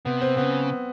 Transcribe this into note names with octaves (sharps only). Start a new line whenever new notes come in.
C3 B3
C4
C#3 B3